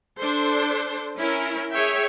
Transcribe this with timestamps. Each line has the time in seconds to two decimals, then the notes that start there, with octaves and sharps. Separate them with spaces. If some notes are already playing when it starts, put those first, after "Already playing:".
0.20 D4 A4 C5
1.18 C#4 E4 A#4
1.74 G#4 C#5 E5 G5